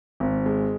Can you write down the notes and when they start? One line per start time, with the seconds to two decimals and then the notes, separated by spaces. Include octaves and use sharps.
0.20 G#1
0.46 G#3